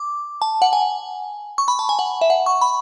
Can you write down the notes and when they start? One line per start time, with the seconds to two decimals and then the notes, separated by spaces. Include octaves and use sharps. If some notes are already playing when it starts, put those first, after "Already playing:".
Already playing: D6
0.42 A5
0.62 F#5
0.73 G#5
1.58 C#6
1.68 B5
1.79 A5
1.89 G#5
1.99 F#5
2.21 E5
2.30 F#5
2.46 C#6
2.61 B5